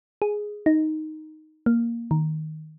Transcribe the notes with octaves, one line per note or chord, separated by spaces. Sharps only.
G#4
D#4
A#3
D#3